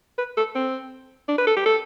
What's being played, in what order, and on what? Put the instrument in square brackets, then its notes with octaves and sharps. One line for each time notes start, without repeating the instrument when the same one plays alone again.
[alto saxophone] B4
A4
C4
D4
B4
A4
G4
A4